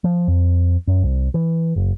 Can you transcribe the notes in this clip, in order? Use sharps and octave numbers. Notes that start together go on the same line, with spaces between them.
F3
F2
F#2
C2
E3
F#1